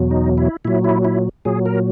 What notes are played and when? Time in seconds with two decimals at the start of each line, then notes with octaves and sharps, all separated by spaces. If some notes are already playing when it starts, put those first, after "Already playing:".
Already playing: E2 B2 F#3
0.11 D#4
0.38 E4
0.65 A#2 F#3 E4
0.84 E4
1.05 E4
1.45 A#2 F#3 G#4
1.66 A#4